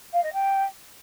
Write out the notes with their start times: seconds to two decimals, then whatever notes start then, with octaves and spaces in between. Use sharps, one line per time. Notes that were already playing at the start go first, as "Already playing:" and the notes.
0.13 F5
0.23 D#5
0.34 G5